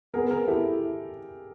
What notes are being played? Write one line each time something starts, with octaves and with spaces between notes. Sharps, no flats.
B3 G#4 A#4
G#4 A#4
E4 G4 A4